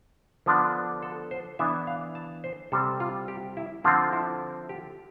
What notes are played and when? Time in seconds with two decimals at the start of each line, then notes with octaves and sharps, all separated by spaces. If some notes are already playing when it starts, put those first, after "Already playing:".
0.46 D3 F3 B3 D4
1.03 A4
1.31 C5
1.59 E3 B3 D4 E5
1.87 F5
2.15 A5
2.44 C5
2.72 C3 G3 C4 A4
3.00 F4
3.28 G4
3.57 E4
3.84 D3 F3 C4 F4
4.13 E4
4.69 G4